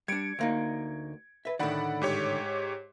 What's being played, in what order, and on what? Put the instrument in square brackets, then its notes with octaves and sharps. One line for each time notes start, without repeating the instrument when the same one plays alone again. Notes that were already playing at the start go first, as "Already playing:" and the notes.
[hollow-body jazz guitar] G3 D4 [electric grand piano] G#6 C#7 D7
[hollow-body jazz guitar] D2 A#3 D#4
B4 E5
[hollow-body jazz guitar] A2 D3 D#3 [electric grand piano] D5 F#5 B5
[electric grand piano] G#2 G4 C#5